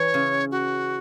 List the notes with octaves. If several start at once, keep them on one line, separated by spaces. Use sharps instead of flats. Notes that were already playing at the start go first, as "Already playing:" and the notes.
Already playing: E3 C#5
C#3
F#4